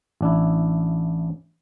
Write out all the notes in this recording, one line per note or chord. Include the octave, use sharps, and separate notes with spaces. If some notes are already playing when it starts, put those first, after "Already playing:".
A1 D4 E4